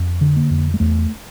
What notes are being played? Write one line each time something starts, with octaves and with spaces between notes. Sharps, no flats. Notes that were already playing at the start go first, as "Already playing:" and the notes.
Already playing: F2
D3
A#3
F2
G#3
E2 A3